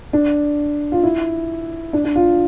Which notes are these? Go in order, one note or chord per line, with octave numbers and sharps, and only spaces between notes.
D4
F4
E4
D4
D4
F4